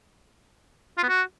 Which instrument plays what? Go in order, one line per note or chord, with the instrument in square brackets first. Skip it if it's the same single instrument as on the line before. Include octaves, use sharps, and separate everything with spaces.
[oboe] F4
B3
F#4